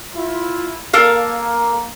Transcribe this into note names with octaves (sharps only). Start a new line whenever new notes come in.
E4 F4
A#3 A4 A#4 F5